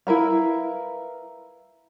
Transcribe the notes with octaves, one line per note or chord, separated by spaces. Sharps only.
E4 A#4 B4 F5